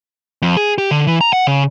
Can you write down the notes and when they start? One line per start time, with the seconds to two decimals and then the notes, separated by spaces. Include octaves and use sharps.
0.42 F2
0.57 G#4
0.78 G4
0.91 D3
1.07 E3
1.21 A#5
1.33 F#5
1.47 C#3